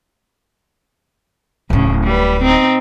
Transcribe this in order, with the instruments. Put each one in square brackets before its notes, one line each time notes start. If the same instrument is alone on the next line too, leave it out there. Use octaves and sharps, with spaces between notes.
[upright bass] D1 D4 [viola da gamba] A2 C#3
[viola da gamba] G3 B4
C4 D#4